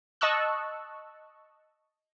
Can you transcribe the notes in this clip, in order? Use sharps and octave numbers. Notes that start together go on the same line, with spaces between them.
D#5 A5 C#6 E6 F#6